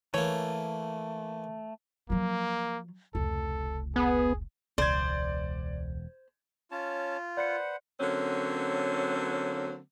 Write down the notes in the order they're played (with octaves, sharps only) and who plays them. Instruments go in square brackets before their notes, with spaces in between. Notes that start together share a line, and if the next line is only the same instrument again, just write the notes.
[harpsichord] E3 A#3 [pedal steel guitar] A3 [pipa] C#5
[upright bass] F3 F#3 [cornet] A#3
[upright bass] F1 C#2 [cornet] A4
[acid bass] B3 [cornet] G#4
[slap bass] E1 [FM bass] C#2 [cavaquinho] C5 [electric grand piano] D5 G#6
[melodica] C#4 C#5 A5 [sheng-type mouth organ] F4
[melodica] B4 C5 F#5 [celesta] D5 C#7
[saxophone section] D3 F#3 A#3 C4 C#4